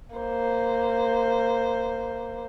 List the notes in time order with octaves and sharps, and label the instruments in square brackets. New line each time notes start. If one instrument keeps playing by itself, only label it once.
[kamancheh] A#3 C5